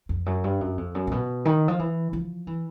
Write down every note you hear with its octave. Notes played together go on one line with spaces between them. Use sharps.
F2
F#2
G2
F#2
F2
F#2
A#2
B2
D#3
F3
E3
F3
E3